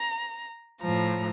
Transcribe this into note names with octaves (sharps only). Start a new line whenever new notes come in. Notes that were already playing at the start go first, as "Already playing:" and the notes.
Already playing: A#5
A2 F3 A#5